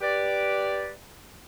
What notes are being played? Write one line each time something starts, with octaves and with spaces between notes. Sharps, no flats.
G4 B4 D5